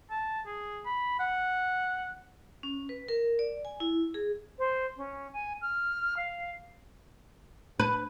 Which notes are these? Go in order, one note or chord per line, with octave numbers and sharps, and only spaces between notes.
A5
G#4
B5
F#5
C#4
B4
A#4
D5
G#5
E4
G#4
C5
C#4
G#5
F6
F5
B4